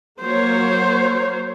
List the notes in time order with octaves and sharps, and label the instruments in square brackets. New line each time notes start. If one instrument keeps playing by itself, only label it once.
[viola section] F#3 A#3 C#5 [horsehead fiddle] C5